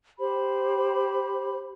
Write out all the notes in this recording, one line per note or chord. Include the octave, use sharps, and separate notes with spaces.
G4 C5 B5